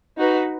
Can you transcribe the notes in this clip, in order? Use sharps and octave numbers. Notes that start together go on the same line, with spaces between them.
D#4 F#4 B4